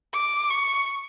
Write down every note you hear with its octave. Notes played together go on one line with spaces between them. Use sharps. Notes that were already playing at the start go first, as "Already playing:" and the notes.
D6
C#6